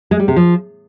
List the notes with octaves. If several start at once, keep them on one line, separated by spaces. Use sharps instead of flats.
G#3
G3
C3
F3